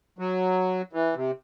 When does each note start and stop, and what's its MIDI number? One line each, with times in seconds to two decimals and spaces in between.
0.19 0.82 54
0.93 1.15 52
1.15 1.31 48